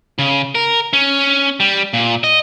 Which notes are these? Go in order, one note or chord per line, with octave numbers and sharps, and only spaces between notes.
C#3
A#4
C#4
G3
A#2
D#5